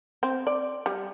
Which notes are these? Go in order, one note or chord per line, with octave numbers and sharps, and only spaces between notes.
C4
D5
G3